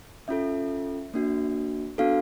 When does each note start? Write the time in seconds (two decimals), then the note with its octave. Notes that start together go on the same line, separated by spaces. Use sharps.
0.28 C#4 F4 A4 E5
1.14 A#3 D4 F#4
1.98 B3 D4 F#4 A4 F5